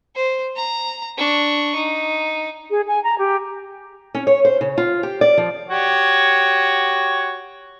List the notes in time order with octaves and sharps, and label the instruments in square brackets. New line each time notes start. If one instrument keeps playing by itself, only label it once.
[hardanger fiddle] C5
A#5
D4 C#6
D#4
[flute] G#4
G#5
A#5
G4
[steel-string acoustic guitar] C#4
C#5
C5
C#3
F4
G4
D5
F3
[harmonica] F#4 G4 C#5